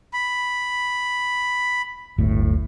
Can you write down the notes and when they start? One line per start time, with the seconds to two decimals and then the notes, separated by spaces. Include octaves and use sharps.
0.13 B5
2.18 D1 G1 A2